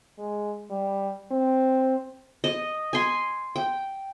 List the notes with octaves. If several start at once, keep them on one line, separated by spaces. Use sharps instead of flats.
G#3
G3
C4
D#5
G#5 C6
G5